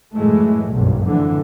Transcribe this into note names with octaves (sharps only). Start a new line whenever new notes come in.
F#2 A2 E3 G#3 A3
F#1 B1 G2
F2 A2 D3 E3